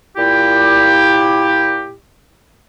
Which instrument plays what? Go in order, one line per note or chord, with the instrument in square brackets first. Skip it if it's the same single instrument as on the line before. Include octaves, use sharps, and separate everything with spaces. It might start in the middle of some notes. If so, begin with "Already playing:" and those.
[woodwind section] A#2 E4 G4